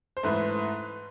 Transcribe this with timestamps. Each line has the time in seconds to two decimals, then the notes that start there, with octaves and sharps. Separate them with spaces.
0.17 C5
0.23 G#2 E3 A3 B4